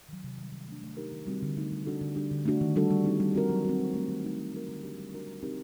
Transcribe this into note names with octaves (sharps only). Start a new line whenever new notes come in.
D#3 F#3
C3
D#3 G3
D#3
A3 D4
A3
D#4 G4 A#4
D#3
G3 C4 F#4
D3
A3 D#4
G3
D4 F#4 A4
D3
G3 D4 G4
D3
A3 D4 F#4
D#3
G3 D4 F#4 A4
G3
C4 D#4
G3
C4 F#4 A#4
F#3
C4 F#4
D#3
A3 C4
D#3
A3 D#4
F#3
A3 C4 F#4 A#4
D3
G3 D4 G4
G3
D4 F#4 A#4
G3
C4 D#4 G4 A#4